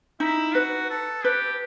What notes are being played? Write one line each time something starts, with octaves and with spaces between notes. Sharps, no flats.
D#4 E4
F#4 B4
A4
G4 B4